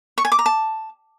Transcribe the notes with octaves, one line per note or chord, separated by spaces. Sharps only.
C#6
G#5
D6
A#5
A5